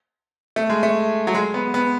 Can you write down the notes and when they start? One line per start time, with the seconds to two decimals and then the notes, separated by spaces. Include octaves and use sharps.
0.56 A3
0.70 G#3
0.83 A3
1.27 F#3
1.34 G#3
1.54 B3
1.74 B3